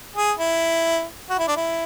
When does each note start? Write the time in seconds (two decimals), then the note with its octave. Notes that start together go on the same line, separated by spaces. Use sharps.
0.16 G#4
0.39 E4
1.30 F#4
1.39 E4
1.48 D4
1.56 E4